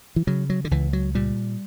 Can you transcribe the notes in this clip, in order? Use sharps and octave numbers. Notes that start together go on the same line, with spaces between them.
E3
C#3 F#3
F#3
D3
C#2 E3
F#3
A#2 G3